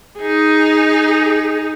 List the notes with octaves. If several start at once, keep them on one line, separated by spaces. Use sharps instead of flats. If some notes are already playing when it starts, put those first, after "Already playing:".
D#4 G#4